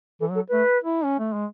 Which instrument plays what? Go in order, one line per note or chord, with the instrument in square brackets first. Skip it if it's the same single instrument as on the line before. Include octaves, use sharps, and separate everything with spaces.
[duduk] E3 [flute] A4
[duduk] F#3 [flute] A4
[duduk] A3 [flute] B4
[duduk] E4
C#4
A3
G#3